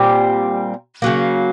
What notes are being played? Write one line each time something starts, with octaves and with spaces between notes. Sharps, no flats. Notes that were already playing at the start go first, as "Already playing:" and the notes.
Already playing: A#2 G3 C4
C#3 F#3 A#3